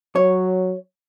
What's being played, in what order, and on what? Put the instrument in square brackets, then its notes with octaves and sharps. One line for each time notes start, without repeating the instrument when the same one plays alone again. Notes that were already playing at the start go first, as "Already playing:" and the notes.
[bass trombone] F#3 [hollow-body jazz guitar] C#5